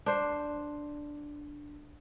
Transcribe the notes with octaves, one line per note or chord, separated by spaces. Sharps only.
D4 C5